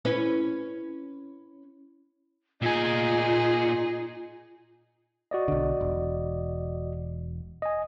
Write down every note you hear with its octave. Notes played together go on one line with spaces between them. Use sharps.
C#4 E4 B4
A#2 D#4 F4 G#4 G#5
F#4 D5 D#5
B1 D3
E1
D#5 G#5